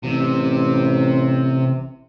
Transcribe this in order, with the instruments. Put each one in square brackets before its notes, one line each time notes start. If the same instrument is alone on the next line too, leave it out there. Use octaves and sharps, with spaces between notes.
[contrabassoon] A1 [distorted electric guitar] C3